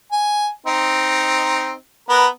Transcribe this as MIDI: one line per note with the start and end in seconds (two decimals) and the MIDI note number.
0.12 0.48 80
0.66 1.73 60
0.66 1.73 63
2.09 2.26 59
2.09 2.26 70